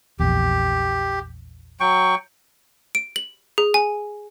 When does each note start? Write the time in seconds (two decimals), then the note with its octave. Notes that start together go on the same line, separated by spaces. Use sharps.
0.20 A#1 E2 G4
1.80 F#3 G5 C#6
2.95 D7
3.16 F#7
3.58 G#4
3.74 G#5